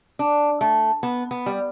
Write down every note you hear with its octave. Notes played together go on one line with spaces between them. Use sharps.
D4
A3
B3
B3
G3